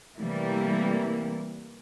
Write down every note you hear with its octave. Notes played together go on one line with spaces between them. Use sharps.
C3 E3 G3 A3 A#3 E4